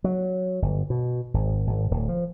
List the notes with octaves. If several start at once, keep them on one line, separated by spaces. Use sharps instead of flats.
F#3
G1
B2
G#1
G#1
D1
F3